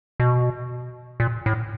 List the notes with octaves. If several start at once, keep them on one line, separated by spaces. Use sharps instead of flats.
B2
A#2
A2